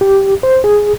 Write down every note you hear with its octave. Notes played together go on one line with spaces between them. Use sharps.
G4
C5
G#4